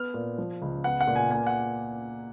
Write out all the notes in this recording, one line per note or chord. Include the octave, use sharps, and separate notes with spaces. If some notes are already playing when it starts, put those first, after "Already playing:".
Already playing: B3 F6
A#2
F3
C#2
B3 F#5
F#5
A#2
G#5
A#3 G#5
F#5